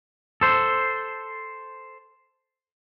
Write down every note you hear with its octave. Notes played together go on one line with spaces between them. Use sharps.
A4 C5